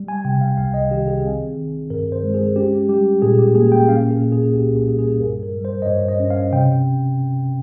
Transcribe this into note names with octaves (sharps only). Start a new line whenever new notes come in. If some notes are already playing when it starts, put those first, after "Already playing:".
Already playing: G3
G#5
C3 G5
F5
C2 F5
D#5
D#3 G4
G#4
C4
D#3
G2 A#4
C5
G#3
G#4
C#4 G4
G3 G4
A#2 G#4
G4
A#3 G#4
G5
C#4 F5
G#4
A#2
G#4
C2 G4
G#4
G3
G#4
G2 A#4
A#4
G3
C5
D#5
G2 C#5
D#5
C#4
F5
C3 G5